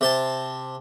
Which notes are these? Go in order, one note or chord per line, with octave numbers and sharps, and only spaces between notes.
C3 C5 A5